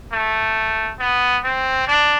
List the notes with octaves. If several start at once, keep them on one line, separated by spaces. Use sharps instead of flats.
A3
B3
C4
D4